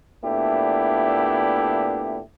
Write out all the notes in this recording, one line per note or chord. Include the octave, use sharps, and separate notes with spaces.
A#2 A3 B3 D4 E4 G4